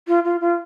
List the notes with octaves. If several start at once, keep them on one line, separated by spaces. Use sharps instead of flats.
F4
F4
F4